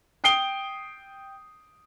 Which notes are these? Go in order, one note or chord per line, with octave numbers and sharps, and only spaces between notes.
G5 D#6 C7 D7 G7